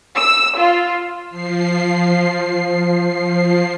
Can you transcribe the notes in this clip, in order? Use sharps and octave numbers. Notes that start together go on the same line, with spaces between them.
E6
F4
F3 C7